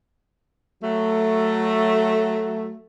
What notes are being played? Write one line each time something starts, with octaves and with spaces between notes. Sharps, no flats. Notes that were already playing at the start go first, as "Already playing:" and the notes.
F#3 A3